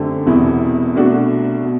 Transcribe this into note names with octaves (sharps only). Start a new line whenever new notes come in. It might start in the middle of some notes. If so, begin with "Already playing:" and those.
Already playing: F#2 D3 A3 C4 G4
E1 E2 C3 E3 B3
C2 B2 A3 D4 F#4
B2